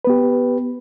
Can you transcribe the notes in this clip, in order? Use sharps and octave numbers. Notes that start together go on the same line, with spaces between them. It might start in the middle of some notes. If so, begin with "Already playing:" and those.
B3 G4 B4